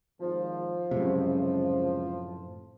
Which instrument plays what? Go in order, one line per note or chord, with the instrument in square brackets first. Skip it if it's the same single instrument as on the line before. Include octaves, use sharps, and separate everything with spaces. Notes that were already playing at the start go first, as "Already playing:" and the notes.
[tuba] G#1 [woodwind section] F3
[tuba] C#2 [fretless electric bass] F#2 A2 C3